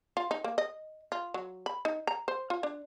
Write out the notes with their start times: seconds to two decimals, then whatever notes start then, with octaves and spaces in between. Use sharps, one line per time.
0.17 F4
0.31 D#4
0.44 A#3
0.58 D#5
1.12 F4
1.34 F#3
1.66 B5
1.85 D#4
2.07 A#5
2.28 C5
2.50 F4
2.63 D4